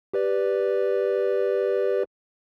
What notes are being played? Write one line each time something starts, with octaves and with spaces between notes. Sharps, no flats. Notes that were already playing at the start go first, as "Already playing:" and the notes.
G4 B4 D5